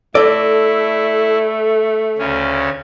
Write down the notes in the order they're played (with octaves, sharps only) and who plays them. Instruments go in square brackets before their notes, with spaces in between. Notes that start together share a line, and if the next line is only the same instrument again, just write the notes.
[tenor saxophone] A3 [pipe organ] E4 [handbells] A4 [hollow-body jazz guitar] D5
[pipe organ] D2 C#3 C#4